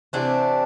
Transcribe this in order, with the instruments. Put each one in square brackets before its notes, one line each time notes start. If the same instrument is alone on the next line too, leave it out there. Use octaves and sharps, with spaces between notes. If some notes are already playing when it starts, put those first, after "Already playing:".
[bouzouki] C3 E3 A3 C4 D4